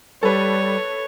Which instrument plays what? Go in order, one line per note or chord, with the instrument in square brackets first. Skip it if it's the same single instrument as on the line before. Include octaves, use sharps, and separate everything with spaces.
[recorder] G3 [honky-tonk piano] A4 B4 [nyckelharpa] C#5